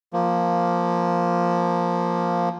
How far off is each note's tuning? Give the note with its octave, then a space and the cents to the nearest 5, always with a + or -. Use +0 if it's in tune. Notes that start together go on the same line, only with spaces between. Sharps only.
F3 +5 A#3 +0